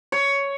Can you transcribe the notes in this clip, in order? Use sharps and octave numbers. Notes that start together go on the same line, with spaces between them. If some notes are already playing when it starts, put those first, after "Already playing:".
C#5